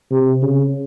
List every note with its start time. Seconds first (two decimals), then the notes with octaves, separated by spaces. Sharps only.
0.11 C3
0.42 C#3